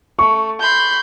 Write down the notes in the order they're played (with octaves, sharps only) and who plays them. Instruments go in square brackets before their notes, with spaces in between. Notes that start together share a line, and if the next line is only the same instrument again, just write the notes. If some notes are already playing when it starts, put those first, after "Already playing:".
[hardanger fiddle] A3 [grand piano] C#6
[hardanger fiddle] B5 C6 [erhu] G6